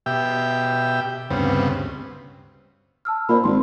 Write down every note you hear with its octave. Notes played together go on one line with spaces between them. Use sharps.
B2 G4 E5 G5
D2 G2 C#3 B3 C4
A5 E6 F6
A#2 C5 D5 B5
G#1 C6